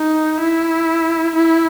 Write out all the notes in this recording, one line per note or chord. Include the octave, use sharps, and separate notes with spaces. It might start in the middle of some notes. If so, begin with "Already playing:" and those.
Already playing: D#4
E4
E4